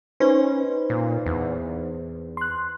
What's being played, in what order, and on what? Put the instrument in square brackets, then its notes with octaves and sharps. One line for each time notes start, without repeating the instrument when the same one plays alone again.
[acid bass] C#4 [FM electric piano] D#4 B4 C5
[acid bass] A#2
E2
[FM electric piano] C6 F#6